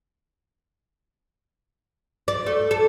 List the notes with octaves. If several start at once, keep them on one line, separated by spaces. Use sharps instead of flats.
D5
A3
A4